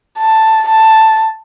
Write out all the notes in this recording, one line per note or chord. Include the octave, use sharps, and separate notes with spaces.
A5
A5